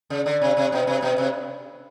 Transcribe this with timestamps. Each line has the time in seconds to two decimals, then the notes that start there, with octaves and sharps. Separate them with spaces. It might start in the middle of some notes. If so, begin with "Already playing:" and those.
0.10 C#3
0.26 D3
0.41 C3
0.57 C3
0.72 B2
0.87 C3
1.02 B2
1.18 C3